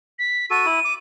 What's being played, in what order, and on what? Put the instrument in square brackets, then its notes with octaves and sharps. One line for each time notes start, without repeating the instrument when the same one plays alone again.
[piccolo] B6
[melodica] F#4 A4 [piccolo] D#7
[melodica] E4
D6